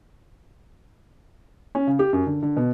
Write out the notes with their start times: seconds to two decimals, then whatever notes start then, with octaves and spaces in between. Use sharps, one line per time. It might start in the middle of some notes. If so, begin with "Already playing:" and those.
1.75 C#4
1.87 C#3
1.99 G4
2.13 F#2
2.27 D3
2.43 D3
2.57 B2